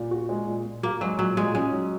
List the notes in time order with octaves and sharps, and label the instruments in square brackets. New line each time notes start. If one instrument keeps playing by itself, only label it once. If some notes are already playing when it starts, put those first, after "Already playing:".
Already playing: [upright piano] A#2
F#4
G#3
A#2
A#2
[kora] A#3 [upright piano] F#4
[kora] F#3 [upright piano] G#3
[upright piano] A#2 [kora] F#3
[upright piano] A#2 [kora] G#3
[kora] G#3 [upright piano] C#4
[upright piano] F#3